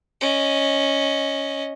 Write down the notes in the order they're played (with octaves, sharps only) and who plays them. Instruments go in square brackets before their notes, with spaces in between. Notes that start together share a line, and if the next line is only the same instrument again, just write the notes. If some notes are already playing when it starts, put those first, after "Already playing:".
[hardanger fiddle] C#4 D#5